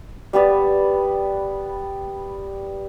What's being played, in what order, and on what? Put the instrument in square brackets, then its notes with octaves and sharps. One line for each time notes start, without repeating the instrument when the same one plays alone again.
[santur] G3 B3 B4 D5